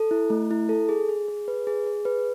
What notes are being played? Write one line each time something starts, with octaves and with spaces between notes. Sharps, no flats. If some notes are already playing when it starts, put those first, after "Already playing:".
Already playing: A4
E4
A3
E4
A4
G#4
G#4
G#4
B4
G#4
G#4
B4